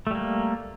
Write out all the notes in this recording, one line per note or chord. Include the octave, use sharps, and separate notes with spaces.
G3 A3 A#3